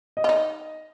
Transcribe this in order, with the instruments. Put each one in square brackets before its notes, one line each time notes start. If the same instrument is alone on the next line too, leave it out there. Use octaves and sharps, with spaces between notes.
[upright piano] D#5
[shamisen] F4
D#4